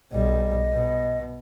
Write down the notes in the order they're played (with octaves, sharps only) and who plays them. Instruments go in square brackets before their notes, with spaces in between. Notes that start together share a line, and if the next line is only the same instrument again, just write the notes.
[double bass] B1 G3 [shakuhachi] D#5
[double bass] B2